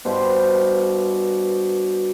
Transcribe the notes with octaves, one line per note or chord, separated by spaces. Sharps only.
G2 B2 C5